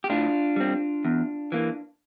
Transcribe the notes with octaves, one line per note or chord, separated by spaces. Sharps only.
G4
A2 D4 F4
G3 C4
E2
E3 A#3